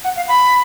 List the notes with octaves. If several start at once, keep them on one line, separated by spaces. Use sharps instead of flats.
F#5
F5
B5